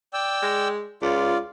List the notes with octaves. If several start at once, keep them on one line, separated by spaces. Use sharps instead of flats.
D5 G5 E6
G#3
C#2 F4 D5